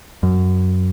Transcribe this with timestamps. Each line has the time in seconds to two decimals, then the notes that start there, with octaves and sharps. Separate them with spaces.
0.23 F#2